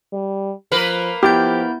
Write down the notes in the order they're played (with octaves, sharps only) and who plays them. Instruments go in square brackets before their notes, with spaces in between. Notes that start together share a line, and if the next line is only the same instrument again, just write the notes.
[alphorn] G3
[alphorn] F3 [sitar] A#3 A#4 B4
[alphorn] F3 [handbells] B3 E4 G6 [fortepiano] G4